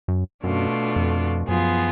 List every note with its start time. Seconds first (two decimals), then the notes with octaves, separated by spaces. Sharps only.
0.08 F#2
0.44 F#2 B2 A3 D4 F4
0.96 F2
1.48 F#2 F3 B3 F4 G#4